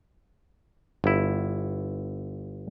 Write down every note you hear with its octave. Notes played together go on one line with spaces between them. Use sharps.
G1 E4